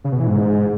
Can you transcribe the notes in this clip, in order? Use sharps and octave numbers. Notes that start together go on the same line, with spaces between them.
C#3
B2
E3
G#2